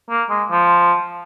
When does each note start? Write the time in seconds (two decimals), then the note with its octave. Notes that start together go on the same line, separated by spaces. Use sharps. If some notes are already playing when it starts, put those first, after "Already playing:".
0.10 A#3
0.29 G#3
0.51 F3